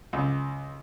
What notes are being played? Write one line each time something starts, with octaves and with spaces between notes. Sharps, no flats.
C#2